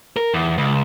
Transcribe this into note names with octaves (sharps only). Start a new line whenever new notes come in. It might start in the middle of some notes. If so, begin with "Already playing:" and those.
A#4
E2
C#2